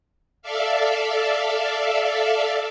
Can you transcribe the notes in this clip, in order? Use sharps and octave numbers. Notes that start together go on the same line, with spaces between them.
A4 D5 E5 F5